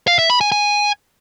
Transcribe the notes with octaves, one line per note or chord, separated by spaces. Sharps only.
F5
E5
B5
G#5
G#5